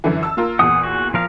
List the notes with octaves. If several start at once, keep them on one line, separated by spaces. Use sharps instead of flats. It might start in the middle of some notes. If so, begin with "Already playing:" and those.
F#2 D3 E3
A5 E6
A#3 F4 A#4
E2 A#2 F#5 D#6
F#4
F3 A#4 F5